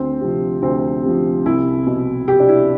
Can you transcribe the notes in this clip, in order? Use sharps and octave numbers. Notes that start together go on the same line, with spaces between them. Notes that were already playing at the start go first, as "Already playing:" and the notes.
Already playing: D2 C4
C3 F3
D2 C4
C3 F3
C2 E4
B2
C2 G4
D4
E4